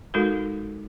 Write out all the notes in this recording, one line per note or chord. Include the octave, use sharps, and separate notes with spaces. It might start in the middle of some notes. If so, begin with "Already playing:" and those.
G#3 D#4 F#4 A4 A#4